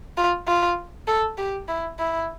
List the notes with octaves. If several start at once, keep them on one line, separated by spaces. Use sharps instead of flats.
F4
F4
A4
G4
E4
E4